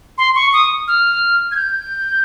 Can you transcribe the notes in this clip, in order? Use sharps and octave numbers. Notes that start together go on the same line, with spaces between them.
C6
C#6
D#6
F6
G#6
G6